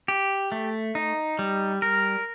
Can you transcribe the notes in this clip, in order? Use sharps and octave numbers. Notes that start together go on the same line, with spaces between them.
G4
A3
D#4
G3
A#4